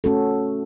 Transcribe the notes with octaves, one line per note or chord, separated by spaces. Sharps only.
A3 C#4 F#4 A4